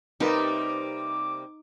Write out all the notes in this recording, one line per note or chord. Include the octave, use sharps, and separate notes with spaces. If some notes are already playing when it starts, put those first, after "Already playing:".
C3 G3 A#3 D#4 G4 A#4 B4 D6